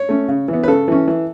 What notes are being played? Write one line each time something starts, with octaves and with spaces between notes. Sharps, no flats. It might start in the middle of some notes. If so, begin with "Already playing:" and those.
Already playing: C#5
A3 C#4
C#3
E3
B3
B4
C#3 A4
E3 C#4
E3